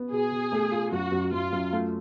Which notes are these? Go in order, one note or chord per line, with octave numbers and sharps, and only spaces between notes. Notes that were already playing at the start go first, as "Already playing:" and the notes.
Already playing: B3
B2 G#4
B2
A3
F4
F#2 F#4
F#2
F#2 F4
F#2
A3